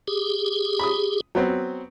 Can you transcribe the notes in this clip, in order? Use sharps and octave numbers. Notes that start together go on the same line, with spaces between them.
G4 G#4
B5 D#6
F#3 B3 C4